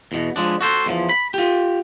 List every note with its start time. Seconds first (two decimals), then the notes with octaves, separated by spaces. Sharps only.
0.12 E2 B2
0.36 F3 G#3 D4
0.61 F#4 A4 C5
0.86 E2 A2 F3
1.09 B5
1.34 F4 G4